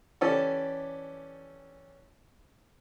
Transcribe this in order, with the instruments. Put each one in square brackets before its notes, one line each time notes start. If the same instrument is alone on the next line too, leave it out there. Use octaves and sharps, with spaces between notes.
[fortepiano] E3 C#4 G4 A4 D5